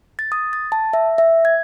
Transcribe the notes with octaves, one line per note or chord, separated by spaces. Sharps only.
A6
D#6
A6
A5
E5
E5
G#6